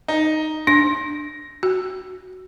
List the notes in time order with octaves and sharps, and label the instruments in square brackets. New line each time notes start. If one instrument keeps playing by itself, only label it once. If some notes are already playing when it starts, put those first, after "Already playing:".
[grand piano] D#4
[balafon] D4 [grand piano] A#6
[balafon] F#4